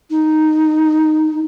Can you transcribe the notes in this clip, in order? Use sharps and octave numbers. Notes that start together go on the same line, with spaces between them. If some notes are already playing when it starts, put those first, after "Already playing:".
D#4